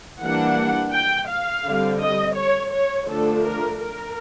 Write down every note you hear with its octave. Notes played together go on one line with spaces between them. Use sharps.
E3 G3 A#3 D4 F#5
G5
F5
D3 G3 C4
D#5
C#5
C#5
D3 F3 A3 D4 A4
A#4
A#4